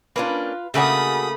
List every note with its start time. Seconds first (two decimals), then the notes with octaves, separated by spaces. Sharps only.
0.16 A#3 C#4 D4 F4 B4
0.74 C#3 A3 A#3 F#4 G#4 A4 B5 D#6